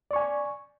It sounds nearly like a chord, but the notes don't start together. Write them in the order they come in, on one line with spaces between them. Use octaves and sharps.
D5 C#6 G#5